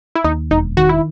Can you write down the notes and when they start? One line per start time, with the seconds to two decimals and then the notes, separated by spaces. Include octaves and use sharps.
0.15 E4
0.24 D#2 D#4
0.51 E1 D#4
0.77 D#3 F#4
0.89 E4